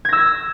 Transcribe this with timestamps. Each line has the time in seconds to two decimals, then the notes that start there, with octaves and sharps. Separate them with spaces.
0.05 G#6
0.09 A#6
0.13 E6